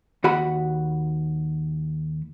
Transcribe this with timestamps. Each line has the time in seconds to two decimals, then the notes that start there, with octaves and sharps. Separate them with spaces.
0.24 D#2 F#4 F#5 B5